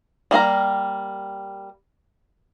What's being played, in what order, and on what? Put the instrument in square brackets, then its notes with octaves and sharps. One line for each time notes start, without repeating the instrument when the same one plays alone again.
[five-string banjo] G3 A#3 F5 A#5